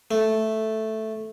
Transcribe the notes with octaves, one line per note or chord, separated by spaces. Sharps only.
A3